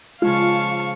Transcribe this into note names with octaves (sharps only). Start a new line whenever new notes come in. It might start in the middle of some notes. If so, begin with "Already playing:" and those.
C#3 F3 G#3 F4 F5 A5 C#6